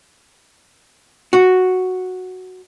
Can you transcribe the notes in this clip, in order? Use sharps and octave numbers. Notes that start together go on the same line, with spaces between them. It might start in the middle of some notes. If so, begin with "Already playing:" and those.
F#4